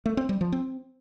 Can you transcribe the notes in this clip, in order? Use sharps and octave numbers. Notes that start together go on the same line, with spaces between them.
A3
C4
G3
F3
C4